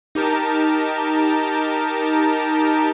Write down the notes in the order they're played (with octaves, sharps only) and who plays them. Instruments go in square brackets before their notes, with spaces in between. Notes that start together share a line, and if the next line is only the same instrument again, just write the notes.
[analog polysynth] D#4 G4 A#4 A5